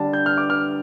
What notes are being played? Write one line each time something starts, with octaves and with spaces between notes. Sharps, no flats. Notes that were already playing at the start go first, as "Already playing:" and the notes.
Already playing: D3 G3 D4 A5
G6
F6
D6
F6